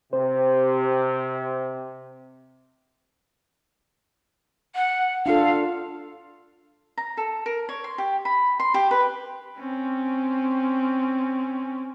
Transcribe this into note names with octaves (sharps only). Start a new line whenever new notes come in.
C3 C5
F#5
D4 F4 A4 F5
A#5
A4
A#4
C#5
C6
G4
B5
C6
G4
B4
C4 C#4